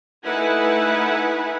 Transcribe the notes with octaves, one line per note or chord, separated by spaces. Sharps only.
A3 D#4 E4 B4 F#5 G#5